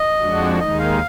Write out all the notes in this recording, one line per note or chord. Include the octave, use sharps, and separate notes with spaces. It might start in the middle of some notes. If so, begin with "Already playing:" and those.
Already playing: D#5
F2 F3 G#3 D4 F#4
D#2 D#3 G#3 D#4 D#5
F5